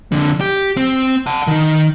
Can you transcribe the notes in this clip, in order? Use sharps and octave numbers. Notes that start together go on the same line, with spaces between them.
F2 D3
G4
C4
F#5 A5
D#3 D#4